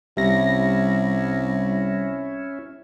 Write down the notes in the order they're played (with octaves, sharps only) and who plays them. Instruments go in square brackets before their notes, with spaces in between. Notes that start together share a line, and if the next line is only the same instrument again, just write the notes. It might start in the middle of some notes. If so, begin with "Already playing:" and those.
[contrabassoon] C2 [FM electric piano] G3 A#6 [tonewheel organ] C#4 E4 [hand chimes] E5